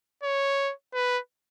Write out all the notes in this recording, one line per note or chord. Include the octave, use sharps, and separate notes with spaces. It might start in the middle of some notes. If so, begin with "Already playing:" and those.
C#5
B4